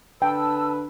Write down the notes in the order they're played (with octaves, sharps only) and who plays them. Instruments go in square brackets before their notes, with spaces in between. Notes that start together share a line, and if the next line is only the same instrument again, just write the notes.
[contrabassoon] D3 [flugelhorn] B4 [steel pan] G5 [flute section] A5 E6